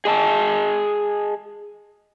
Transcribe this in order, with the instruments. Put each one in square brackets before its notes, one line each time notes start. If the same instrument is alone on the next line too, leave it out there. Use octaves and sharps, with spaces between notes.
[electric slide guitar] G#4 D#5 A5